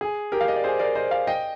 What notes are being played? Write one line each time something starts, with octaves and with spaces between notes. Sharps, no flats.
G#4
G4 A#4
F5
D#5
D5
G#4 C5
A#4 D5
C5 D#5
D5 F5
D#5 G5